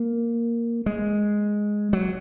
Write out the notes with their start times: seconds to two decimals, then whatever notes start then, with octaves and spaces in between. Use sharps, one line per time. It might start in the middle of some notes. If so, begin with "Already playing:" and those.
Already playing: A#3
0.86 G#3
1.93 F#3